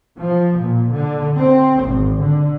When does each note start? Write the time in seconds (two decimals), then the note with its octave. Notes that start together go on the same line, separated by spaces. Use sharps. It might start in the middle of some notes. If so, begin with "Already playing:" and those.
0.19 F3
0.59 A#2
0.92 D3
1.37 C4
1.84 G#1
2.20 D3